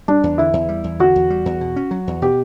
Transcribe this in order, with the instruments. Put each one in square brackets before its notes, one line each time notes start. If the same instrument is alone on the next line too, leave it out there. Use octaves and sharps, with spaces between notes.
[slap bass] G3 [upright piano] D4
[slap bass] E2
[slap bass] D3 [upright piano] E4
[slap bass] E2
G3
E2
[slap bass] D3 [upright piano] F#4
[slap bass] E2
G3
E2
B2
C#4
F#3
E2
[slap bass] B2 [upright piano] G4